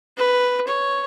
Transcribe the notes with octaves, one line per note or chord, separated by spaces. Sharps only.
B4
C#5